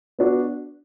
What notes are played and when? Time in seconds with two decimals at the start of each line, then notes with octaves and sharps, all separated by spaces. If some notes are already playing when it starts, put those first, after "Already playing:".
0.19 B3 D4 F#4